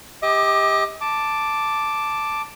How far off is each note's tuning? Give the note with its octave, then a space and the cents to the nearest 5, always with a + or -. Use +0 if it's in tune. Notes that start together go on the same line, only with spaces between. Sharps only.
G4 +20 D#5 +40 D6 +35
A5 +0 D6 +0